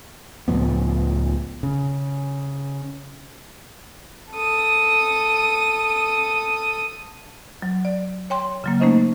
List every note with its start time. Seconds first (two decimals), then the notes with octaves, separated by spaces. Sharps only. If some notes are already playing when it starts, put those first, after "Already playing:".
0.48 C#2 A2 F3 B3
1.63 C#3
4.31 A4 D#6
7.62 F#3
7.85 D5
8.30 C#5 G5 C6
8.64 C#3 F#3 A#3
8.80 A3 A#3 C#4 D#4 C5 D#5